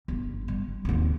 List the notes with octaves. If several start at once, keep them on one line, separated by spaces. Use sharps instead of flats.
G1
G3
D#2 C4